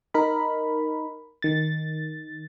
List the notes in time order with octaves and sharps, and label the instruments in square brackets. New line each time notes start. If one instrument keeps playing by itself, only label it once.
[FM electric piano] D#4 A#4 B5
D#3 A6